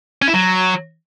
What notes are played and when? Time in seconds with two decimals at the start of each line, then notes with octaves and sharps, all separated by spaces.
0.22 C#4
0.28 E4
0.34 F#3